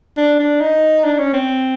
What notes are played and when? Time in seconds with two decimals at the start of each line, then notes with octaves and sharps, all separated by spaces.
0.17 D4
0.40 D4
0.61 D#4
1.05 D4
1.19 C#4
1.33 C4